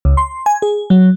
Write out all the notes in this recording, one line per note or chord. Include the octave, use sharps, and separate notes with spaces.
C#2
C6
G#5
G#4
F#3